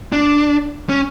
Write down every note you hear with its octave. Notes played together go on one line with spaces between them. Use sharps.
D4
C#4